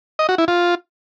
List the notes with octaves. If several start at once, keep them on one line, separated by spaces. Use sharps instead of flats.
D#5
F#4
E4
F4